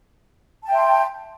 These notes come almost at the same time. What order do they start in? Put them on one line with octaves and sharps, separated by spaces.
A5 G5 E5 C6